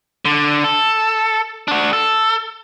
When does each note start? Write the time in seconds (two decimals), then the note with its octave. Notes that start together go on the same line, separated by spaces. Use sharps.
0.25 D3
0.64 A4
1.68 D4 F#4
1.93 A4